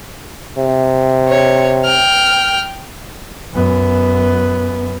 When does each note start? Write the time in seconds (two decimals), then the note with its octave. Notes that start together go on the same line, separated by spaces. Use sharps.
0.59 C3
1.28 C#5
1.85 G5 F6
3.53 F#2 B3